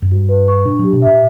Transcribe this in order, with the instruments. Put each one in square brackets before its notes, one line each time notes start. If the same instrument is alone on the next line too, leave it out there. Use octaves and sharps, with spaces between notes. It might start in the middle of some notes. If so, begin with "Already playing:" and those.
[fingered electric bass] F#2
[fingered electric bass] G2 [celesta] F#4
[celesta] B4
C#6
[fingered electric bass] A#2 [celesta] D4
[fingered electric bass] F#3 [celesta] G4
[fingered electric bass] B2
[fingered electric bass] A#2 [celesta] E5